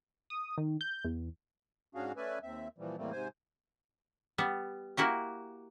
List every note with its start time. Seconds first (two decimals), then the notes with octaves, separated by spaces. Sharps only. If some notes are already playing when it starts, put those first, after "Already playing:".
0.30 D#6
0.58 D#3
0.81 G6
1.04 E2
1.95 G#2 C#4 D4 F#4 G#4 F5
2.16 A3 C#4 B4 D5 E5 G#5
2.43 D#2 C4 E5
2.78 A#2 E3 F3 G3
2.97 E2 A2 G3 A3 A#3 C4
3.12 G#2 C3 C5 G#5
4.38 G3 B3
4.97 A#3 E4 F#4 G4